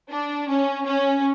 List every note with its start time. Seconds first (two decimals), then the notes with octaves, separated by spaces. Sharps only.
0.11 D4
0.49 C#4
0.86 C#4